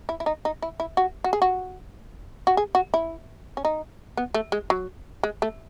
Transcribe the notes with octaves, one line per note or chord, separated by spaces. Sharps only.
E4
E4
D#4
D#4
E4
E4
F#4
F#4
G#4
F#4
F#4
G#4
F#4
E4
C#4
D#4
B3
A3
G#3
F#3
G#3
A3